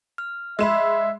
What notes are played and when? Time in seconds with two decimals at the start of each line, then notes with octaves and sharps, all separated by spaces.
0.18 F6
0.59 G#3 E5 B5 C6 E6 E7